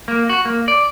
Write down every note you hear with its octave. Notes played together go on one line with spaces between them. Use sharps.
A#3
F#4
A#3
D5